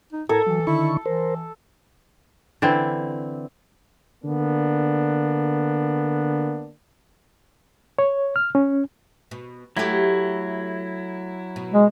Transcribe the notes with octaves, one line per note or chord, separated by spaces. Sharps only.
D#4
A2 A4 A#4 A#5 G#6
E3 F#3
D3 D#3 E4 C#6
E3 A#4 C5
D3 E3 C4 E4
D3 A#3 B3 D4
C#5
F6
C#4
B2
F#3 A3 E4 G4
B2
G#3